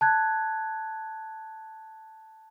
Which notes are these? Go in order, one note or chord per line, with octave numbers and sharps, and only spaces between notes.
A5 F#6 G#6